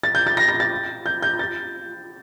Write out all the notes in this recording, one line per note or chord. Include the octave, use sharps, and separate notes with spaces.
A6
G6
A6
A#6
A#6
A6
G6
G6
A6